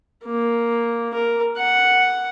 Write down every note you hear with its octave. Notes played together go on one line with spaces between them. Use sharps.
A#3
A#4
F#5